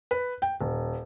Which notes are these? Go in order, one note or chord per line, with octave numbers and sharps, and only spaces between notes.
B4
G5
D#1